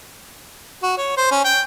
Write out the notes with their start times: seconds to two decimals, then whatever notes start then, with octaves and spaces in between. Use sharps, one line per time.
0.83 F#4
0.98 C#5
1.17 C5
1.31 C#4
1.44 G5